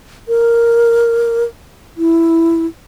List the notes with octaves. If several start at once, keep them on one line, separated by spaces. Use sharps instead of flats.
A#4
E4